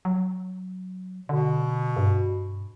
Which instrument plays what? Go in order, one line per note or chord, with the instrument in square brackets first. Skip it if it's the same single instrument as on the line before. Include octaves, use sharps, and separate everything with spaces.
[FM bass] F#3
[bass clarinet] B2 [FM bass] D3
[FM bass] G2